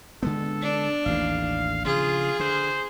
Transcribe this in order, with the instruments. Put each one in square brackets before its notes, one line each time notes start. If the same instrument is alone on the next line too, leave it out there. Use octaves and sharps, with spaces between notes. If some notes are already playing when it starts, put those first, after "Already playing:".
[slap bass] D3 G#3 B3 [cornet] A4
[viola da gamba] D4
[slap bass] A1 D#2 A2 [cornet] F5
[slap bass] C#3 F3 [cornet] F4 [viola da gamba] G#4
[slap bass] D3 [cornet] C5